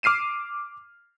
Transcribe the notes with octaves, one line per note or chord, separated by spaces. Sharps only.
D6 F6 C7 D#7 E7